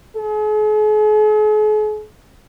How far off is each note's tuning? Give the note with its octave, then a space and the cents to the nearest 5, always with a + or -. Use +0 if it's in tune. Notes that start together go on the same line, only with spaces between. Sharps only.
G#4 +45